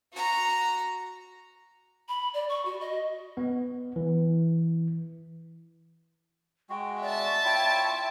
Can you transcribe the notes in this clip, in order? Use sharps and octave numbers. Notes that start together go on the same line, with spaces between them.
F#4 A#5
B5
D5
C#6
F#4
D#5
B3
E3
G#3 F#4 G5
D5 E5 A5
E4 F4 C#5 G5